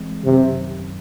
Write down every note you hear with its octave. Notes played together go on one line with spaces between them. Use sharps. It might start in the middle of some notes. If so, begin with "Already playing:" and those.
Already playing: E3 G#3 C4
F#2 C3 D#3 F#3